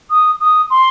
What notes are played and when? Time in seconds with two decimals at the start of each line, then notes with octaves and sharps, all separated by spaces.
0.10 D#6
0.41 D#6
0.70 C6